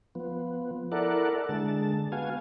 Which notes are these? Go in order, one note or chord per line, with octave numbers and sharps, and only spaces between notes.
F3 B3
E4 A4 A#4 D5 F#5
D3 G#3 A5
B3 F#4 F5 G#5